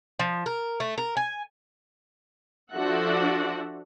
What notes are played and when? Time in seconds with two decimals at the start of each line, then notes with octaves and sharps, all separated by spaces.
0.19 F3
0.46 A#4
0.80 A3
0.98 A#4
1.17 G#5
2.74 F3 D4 F#4 A4 E5 F#5